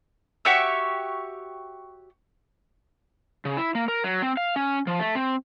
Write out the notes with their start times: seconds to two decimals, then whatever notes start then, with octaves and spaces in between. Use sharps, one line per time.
0.45 F#4 G4 C#5 E5
3.45 C#3
3.57 E4
3.75 A#3
3.88 A#4
4.04 F#3
4.22 C4
4.37 F5
4.56 C#4
4.87 F3
4.99 A3
5.15 C4